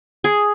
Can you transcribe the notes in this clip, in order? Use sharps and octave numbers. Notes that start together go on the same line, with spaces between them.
G#4